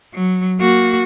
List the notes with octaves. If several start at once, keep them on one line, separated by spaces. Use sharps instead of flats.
F#3
A#3 F#4